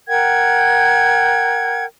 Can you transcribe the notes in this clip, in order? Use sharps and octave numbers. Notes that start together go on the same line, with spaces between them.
A#4 F#5 G5 G#6